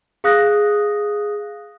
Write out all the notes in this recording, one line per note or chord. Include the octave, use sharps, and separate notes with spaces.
G#4 F5 D#6 F#6 A#6